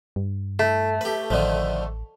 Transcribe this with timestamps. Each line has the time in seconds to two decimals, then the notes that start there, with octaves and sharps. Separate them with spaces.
0.16 G2
0.59 A3 E4
1.01 G4 B4
1.30 A1 D3 D#3 F3